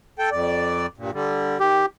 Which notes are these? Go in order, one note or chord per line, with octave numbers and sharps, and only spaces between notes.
A4 G5
F2 D5
G2 A#2
D3 G3
D#3 G4